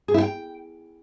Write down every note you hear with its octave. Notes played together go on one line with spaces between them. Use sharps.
G#4
E4
G5